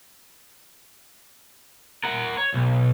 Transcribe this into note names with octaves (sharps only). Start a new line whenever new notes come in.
A#4 F#5
C#5
B1